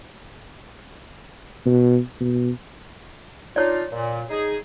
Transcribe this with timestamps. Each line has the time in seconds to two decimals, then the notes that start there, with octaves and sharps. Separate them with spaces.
1.66 B2
2.20 B2
3.56 D4 D#4 F4 C#5 D5
3.92 A#2
4.29 D#4 G#4